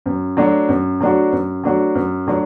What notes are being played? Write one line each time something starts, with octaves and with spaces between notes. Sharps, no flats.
F#2
F#3 A3 D4 F#4
F#2
F#3 A3 D4 F#4
F#2
F#3 A3 D4 F#4
F#2
F#3 A3 D4 F#4